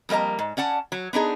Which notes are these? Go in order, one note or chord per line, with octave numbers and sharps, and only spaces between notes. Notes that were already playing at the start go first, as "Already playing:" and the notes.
F2 G3 A#3 D#5 A#5
G#2
C#4 D5 F#5 A5
F#3
B3 D4 D#4 G#4